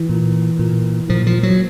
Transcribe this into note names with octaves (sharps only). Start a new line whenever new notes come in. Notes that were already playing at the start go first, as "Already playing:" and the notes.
Already playing: E3
A#2
A#2
A#2 F3
F3
F#3